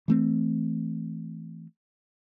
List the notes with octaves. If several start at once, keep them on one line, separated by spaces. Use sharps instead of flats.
E3 A3 C4